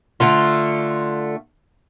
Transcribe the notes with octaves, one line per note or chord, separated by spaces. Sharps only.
D3 A3 F4